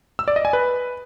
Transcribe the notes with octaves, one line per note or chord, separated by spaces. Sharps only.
E6
D5
D#5
G#5
B4